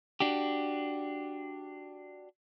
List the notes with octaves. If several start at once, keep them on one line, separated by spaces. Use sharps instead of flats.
D4 F#4 G4